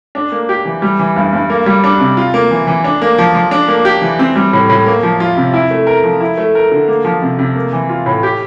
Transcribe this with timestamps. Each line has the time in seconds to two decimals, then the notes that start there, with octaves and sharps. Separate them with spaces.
0.15 D4
0.32 A#3
0.49 G4
0.65 E3
0.82 G3
0.99 E3
1.16 G2
1.33 G2
1.50 A#3
1.66 G3
1.84 D4
2.00 C3
2.17 F4
2.34 A#3
2.51 E3
2.67 E3
2.84 D4
3.02 A#3
3.18 F3
3.35 F3
3.51 D4
3.68 A#3
3.85 G4
4.02 E3
4.19 C4
4.36 G3
4.53 A2
4.69 A2
4.86 A#3
5.03 F3
5.20 F4
5.37 C3
5.54 E4
5.71 A3
5.87 A#4
6.04 F3
6.20 E4
6.38 A3
6.55 A#4
6.71 D3
6.88 A#3
7.05 F3
7.22 C3
7.39 C3
7.56 A#3
7.73 E3
7.89 F4
8.06 A2
8.23 G4